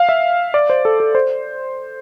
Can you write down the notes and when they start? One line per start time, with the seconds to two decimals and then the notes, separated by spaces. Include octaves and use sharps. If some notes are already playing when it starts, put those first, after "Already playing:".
Already playing: F5
0.09 E5
0.54 D5
0.70 C5
0.85 A4
1.00 A4
1.15 C5